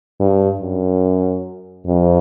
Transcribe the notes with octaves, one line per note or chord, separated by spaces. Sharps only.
G2
F#2
F2